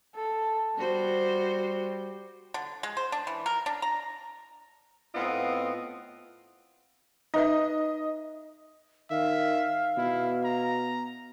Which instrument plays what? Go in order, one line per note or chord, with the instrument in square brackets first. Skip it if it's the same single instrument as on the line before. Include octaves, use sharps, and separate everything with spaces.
[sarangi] A4
[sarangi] G3 [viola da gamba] F#4 C5
[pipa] D3
G#3
C5
D4
E3
A#4
D4
A#5
[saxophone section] A2 B3 C4 F4 D#5
[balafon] D#4 B4 E5 [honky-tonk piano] D#5
[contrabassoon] D#3 [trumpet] E5 [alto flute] F5
[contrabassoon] B2 [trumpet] E4
[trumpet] A#5